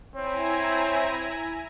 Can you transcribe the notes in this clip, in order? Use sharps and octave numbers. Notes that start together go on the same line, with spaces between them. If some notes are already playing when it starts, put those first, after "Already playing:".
C4 E4 C#5 G#5 A#5